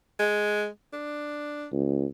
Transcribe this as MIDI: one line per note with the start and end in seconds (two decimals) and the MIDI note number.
0.19 0.68 56
0.93 1.67 62
1.72 2.06 37